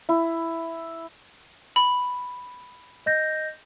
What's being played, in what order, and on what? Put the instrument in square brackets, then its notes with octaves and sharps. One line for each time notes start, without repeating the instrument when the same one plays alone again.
[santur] E4
[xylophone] B5
[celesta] D#5 G6 A#6